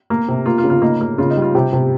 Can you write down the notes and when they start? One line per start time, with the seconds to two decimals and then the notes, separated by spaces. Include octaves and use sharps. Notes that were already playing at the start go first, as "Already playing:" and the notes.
0.10 A#3
0.28 C3
0.46 A#3 F4
0.58 F4
0.64 C#3
0.70 F4
0.82 A#3 D#4
1.01 A#3
1.18 C#3 F4
1.30 D#4
1.37 G3
1.42 F4
1.55 C3 G4
1.73 C3